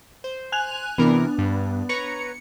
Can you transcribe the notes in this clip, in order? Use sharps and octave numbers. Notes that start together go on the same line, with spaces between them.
C5
G#5 F#6 F7
C3 E3 B3 D4 A#4
G2
B4 C#5 A#5 C#7